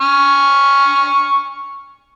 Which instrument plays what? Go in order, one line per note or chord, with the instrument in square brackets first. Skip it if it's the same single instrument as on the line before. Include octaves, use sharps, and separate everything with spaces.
[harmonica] C#6 F6